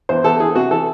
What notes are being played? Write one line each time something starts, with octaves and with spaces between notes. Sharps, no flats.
E2 C5
E2 A4
E3 G#4
C3 F#4
E3 A4